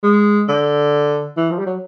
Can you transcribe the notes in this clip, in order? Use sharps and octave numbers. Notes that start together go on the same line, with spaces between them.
G#3
D3
E3
F3
G3
F#3